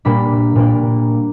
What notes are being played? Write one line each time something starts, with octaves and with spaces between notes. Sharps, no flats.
A#2 G3 A#3 D4 B5
A#2 G3 A#3 D4